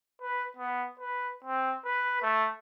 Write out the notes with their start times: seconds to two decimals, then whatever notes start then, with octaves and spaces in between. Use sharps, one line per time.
0.22 B4
0.57 B3
0.99 B4
1.44 C4
1.85 B4
2.22 A3